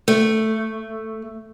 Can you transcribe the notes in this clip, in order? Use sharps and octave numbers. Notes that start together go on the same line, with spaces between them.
A3